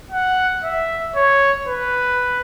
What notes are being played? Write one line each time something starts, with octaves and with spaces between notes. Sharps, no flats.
F#5
E5
C#5
B4